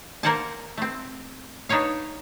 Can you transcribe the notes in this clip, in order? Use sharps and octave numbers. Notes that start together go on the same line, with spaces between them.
A#3 A#4 C5 F#5 G#5 A5
A3 C4
D4 D#4 B4 C#5 F5